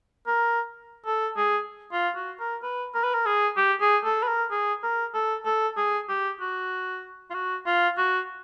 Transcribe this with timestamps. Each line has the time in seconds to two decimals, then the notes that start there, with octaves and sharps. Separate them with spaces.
0.27 A#4
1.06 A4
1.37 G#4
1.92 F4
2.16 F#4
2.39 A#4
2.63 B4
2.94 A#4
3.04 B4
3.14 A#4
3.26 G#4
3.57 G4
3.81 G#4
4.05 A4
4.23 B4
4.28 A#4
4.51 G#4
4.83 A#4
5.14 A4
5.46 A4
5.77 G#4
6.09 G4
6.40 F#4
7.30 F4
7.34 F#4
7.66 F4
7.97 F#4